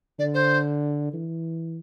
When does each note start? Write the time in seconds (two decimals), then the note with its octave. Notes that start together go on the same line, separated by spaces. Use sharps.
0.19 D3 D5
0.34 C5
1.13 E3